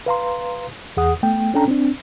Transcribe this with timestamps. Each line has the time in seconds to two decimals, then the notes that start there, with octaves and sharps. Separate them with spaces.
0.06 B4 F5 A#5 C6
0.97 E2 G#4 F#5 D#6
1.23 A3 B3 G5
1.54 C#4 D4 A4 G5 A5 A#5
1.68 C4 D4